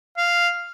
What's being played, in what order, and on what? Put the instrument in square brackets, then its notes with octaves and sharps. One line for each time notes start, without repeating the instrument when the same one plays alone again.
[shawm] F5